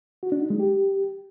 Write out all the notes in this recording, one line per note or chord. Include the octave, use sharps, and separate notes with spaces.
F#4
D4
D#4
G#3
G4